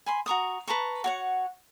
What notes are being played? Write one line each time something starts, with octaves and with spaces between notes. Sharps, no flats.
G#5 B5 C6
F#4 A#5 C#6 D#6
B4 A5 A#5 C#6
F#4 C#5 F#5